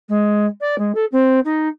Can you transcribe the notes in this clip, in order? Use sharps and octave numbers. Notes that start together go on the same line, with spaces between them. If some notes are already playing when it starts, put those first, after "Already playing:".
G#3
D5
G#3
A4
C4
D#4